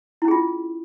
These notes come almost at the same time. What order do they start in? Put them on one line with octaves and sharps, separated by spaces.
E4 C#4 G#4 F4